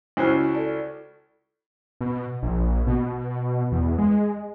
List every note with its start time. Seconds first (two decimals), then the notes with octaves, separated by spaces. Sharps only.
0.17 C#2 C#4 E4 F#4 C5
0.53 A4 D5 A5
2.01 B2
2.43 A#1
2.87 B2
3.72 E2
3.98 G#3